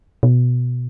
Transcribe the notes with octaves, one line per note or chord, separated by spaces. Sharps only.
B2